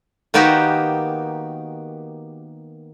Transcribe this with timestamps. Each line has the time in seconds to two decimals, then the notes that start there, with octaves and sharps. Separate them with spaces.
0.34 D#3 A#3 B3 D#4 F#4 G4